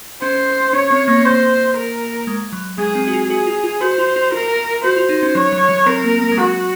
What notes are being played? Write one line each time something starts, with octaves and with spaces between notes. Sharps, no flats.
C#4 C5
C#4 C#5
C4
A#3
C4
C5
A#3
A#4
G#3
F#3
G#3 G#4
C4
F#4
F4
F#4 G#4
F4
F4
F#4 C5
F4
F4
F4 A#4
F#4 C5
F4
D#4
C#4
F#3 C#5
F#3
F#3
C4 A#4
A#3
A#3
G#3
F#3 F#4